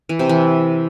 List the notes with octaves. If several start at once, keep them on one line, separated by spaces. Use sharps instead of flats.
E3
C3
E3